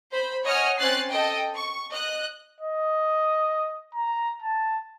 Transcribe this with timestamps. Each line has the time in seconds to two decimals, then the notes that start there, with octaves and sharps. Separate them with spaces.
0.12 C5 B5
0.45 C#5 D#5 F#5 G#5 F6
0.77 C4 C#4 F#6 A6 C7
1.10 A4 D#5 G5
1.54 C#6
1.90 D#5 F#6
2.61 D#5
3.95 A#5
4.42 A5